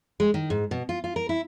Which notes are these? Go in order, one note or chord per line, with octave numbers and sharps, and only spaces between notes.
G#3
D#3
G#2
B2
F4
F4
A#4
E4